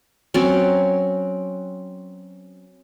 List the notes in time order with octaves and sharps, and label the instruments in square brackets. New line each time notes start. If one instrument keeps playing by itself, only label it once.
[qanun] F#3 C4 C#4